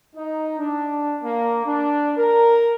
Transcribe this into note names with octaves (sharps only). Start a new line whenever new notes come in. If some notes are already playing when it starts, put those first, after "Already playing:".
D#4
D4
A#3
D4
A#4